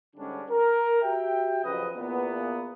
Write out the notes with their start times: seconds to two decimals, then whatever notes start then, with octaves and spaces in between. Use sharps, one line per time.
0.16 G#2 D3 G3 C#4 D4
0.50 A#4
1.02 F#4 G4 E5 G5
1.64 F2 C#3 F#3 B4 D#5
1.96 E2 A#2 A#3 B3